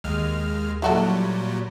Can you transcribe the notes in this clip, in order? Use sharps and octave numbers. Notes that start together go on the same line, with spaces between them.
D#2 G#3 F6
A#2 F#3 G3 E4 F#4 A4